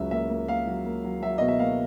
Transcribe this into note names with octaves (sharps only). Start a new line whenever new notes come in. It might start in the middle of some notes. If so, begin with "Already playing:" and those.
Already playing: C#2 F#3 E5
A#3 E5
A#3
A#3 F5
F#3
A#3
F#3
F#3 E5
B2 D#5
E5
A#3 F5